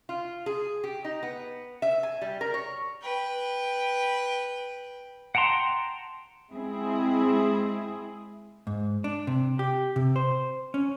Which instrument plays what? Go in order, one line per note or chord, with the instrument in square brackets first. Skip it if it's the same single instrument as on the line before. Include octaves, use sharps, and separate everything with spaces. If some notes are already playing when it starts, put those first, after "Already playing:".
[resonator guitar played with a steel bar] F4
G#4
G4
D#4
B3
E5
G#5
G3
A#4
C#5
[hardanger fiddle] B4 G5
[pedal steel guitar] F#5 G5 A5 A#5 C6
[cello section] G#3 C4 E4 G#4
[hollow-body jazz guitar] G#2
D4
C3
G4
C3
C5
C#4